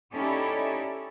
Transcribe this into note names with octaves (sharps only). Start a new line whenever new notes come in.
C#4 D#4 E4 G4 A4 D5